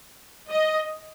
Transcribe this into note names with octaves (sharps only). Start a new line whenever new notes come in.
D#5